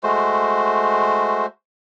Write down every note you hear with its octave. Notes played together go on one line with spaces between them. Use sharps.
G#3 A3 F#4 C5